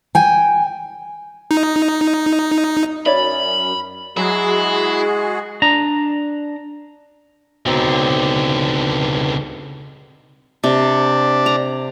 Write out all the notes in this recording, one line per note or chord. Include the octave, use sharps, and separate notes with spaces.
G5 G#5
D#4
F#2 C#5 D5 E5 B5
F#3 G#3 E4 F#4 G#4
D4 A#5
C#2 B2 D3 C4 D#4
C3 D4 D5
A#5